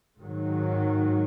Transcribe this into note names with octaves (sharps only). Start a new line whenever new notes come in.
G#2 D#3 F#3